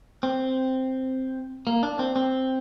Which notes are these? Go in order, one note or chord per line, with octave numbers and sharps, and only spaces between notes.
C4
A#3
D4
C4
C4